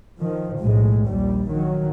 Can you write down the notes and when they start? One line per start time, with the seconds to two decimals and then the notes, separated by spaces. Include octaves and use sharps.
0.20 D#3 F3
0.59 B1 A2 G#3
1.07 A#1 D#2 G3
1.50 D#3 F#3